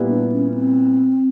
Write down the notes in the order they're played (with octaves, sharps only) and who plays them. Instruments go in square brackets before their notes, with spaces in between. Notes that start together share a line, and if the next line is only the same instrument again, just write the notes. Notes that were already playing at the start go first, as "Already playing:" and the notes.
Already playing: [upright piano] A#2 G3 B3 E4
[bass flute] D4
C#4
C4